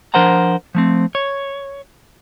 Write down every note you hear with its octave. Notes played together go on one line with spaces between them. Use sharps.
F3 D4 A#4 C5 F#5 A#5
F3 A3 C4
C#5